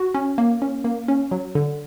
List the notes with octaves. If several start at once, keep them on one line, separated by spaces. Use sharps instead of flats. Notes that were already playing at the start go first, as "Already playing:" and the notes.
Already playing: F#4
C#4
A#3
C#4
A#3
C#4
F#3
D3